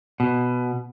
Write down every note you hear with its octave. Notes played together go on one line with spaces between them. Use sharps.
B2